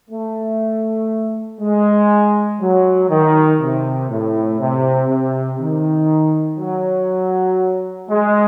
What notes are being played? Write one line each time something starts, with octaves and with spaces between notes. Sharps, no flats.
A3
G#3
F#3
D#3
C3
A2
C3
C3
D#3
F#3
G#3